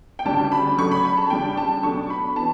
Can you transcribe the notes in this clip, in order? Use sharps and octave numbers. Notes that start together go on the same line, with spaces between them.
G5
D2 C#3 G3 D4 A5
B5
C#3 F#3 A3 C#6
B5
B5
A5
C#3 G3 D4 G5
A5
B2 F#3 A3 D4 C#6
B5
E3 B3 A5